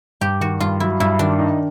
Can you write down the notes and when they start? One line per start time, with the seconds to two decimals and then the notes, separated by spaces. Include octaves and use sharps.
0.21 G2 G4
0.41 D#3 F#4
0.60 G2 F4
0.80 F#3 E4
1.00 G2 E4
1.19 D#3 D4
1.39 D#4